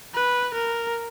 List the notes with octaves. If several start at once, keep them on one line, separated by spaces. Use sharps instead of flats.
B4
A#4